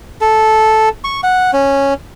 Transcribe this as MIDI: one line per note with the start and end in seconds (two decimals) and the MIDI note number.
0.21 0.89 69
1.04 1.21 85
1.23 1.51 78
1.53 1.94 61